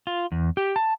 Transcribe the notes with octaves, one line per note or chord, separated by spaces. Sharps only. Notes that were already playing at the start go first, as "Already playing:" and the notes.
F4
E2
G4
A5